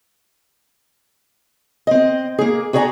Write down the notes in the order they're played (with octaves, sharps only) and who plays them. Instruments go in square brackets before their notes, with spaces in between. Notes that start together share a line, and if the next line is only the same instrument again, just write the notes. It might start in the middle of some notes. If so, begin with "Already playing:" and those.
[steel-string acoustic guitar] C4 D#5
A#3 G#4
F#4 G#4 D5 G#5 A#5